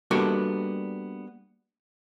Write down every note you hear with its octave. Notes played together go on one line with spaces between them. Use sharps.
G3 A#3 B3 D4 F#4 A4